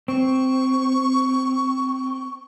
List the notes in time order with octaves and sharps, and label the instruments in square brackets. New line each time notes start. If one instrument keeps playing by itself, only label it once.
[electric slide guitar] C4 [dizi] C#6